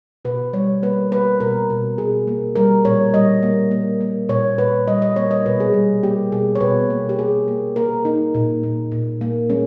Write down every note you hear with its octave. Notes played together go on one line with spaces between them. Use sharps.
B2 B4
G3 C#5
A#3 B4
A#3 B4
B2 A#4
B2
B2 G#4
A#3
G3 A#4
A#2 C#5
G3 D#5
A#3
A#3
A#3
A#2 C#5
A#2 B4
G3 D#5
D#5
A#3 C#5
D#5
B2 B4
G#4
G3
A#3 G4
B2 G#4
C#5
B2 B4
A#3
G4
A#3 G#4
A#3
A#3 A#4
A#3 D#4
A#2
A#2
A#2
A#3
G#3 C#4